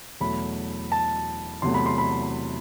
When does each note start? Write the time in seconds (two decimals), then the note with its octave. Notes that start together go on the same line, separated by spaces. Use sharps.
0.21 E2 B2 F#3 A3 B5
0.92 A5
1.62 E2 C3 F#3 A3 C6
1.74 B5
1.86 C6
1.98 B5